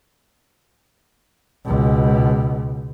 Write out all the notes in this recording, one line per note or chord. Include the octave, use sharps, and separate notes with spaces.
C#2 B2